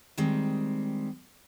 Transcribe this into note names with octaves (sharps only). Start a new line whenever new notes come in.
D#3 G3 G#3 C4